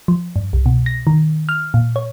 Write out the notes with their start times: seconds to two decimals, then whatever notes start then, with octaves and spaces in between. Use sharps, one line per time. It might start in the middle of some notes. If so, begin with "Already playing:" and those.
0.08 F3
0.36 G2
0.53 C2
0.66 B2
0.86 A#6
1.07 D#3
1.49 F6
1.74 A#2
1.96 C#5